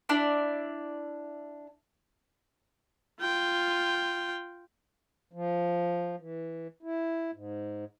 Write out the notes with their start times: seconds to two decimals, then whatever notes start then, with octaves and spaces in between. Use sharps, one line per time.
0.09 D4 E4 D5
3.20 F4 G5
5.33 F3
6.20 E3
6.83 E4
7.34 G#2